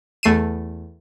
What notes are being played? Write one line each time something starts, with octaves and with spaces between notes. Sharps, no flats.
E2 A3 C7 D#7 E7